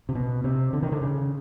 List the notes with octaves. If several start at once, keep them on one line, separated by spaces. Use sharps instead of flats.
C3
B2
C3
D3
D#3
D3
C#3